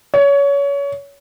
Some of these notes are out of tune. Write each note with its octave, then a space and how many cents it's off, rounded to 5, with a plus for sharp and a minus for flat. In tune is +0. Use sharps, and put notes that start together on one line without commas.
C#5 +25